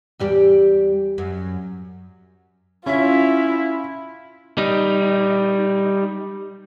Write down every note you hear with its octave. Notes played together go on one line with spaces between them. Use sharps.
E2 G3 G4
F#2
C#4 E4 F4 E5
G3 D#4